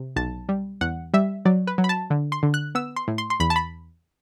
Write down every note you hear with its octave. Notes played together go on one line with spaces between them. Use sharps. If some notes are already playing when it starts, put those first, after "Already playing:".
Already playing: C3
B1 A5
G3
E2 F#5
G3 E5
F#3 D5
B4
F#3
B5
A5
D3
C6
D3
F#6
B3 E6
C6
A2
C6
C6
E2 B5
A5
B5